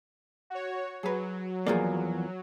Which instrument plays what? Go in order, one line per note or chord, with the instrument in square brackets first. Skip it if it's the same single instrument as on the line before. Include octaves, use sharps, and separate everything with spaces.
[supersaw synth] F#4 C#5
[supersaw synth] F#3 [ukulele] G#4 B4
[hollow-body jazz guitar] E2 F3 A#3 [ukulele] G#4 D5